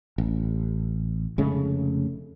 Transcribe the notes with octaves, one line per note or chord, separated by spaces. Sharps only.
A1
F1 C#3 G#3 A3